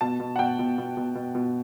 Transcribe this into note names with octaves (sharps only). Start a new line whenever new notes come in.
B2 A5
B2
F#5
B2 G5
B2
B2
B2
B2
B2